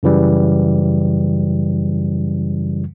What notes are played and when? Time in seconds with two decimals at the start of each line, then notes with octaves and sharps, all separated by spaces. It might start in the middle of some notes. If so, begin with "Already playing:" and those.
0.03 F#2 C#3 E3 G3